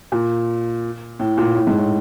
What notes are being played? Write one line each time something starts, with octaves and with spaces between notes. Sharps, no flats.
A#2
A2
A#2
A2
G#2
A2